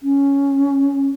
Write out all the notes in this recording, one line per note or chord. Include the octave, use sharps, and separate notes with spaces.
C#4